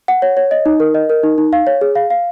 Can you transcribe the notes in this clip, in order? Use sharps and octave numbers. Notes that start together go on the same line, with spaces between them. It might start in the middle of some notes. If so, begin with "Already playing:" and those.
F#5
C#5
C#5
D#5
D#4
A#4
D#5
A#4
D#4
D#4
F5
C#5
G#4
F5
F5